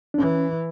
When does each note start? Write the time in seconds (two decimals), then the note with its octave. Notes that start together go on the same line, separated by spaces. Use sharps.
0.14 D4
0.18 E3 C#4